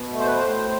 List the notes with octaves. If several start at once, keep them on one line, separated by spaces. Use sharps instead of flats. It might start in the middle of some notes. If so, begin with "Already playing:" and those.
Already playing: B2
A3
C5
B4
C5
A2